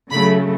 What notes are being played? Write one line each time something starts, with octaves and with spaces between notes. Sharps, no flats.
C#3 F#3 A3 B5